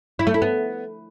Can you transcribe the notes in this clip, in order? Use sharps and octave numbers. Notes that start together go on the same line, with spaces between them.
E4
A3
E4
B3